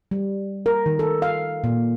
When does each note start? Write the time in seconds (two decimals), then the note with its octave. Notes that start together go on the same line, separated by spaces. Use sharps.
0.11 G3
0.66 A#4
0.86 D#3
0.99 A4
1.22 F5
1.64 A#2